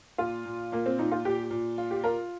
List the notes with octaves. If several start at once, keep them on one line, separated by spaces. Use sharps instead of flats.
A#2 F4
A#2
A#2 A#3
C4
A#2 D#4
F4
A#2 G4
A#2
F4
G4
F4 A#4